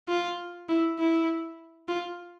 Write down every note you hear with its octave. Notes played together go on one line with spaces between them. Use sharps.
F4
E4
E4
F4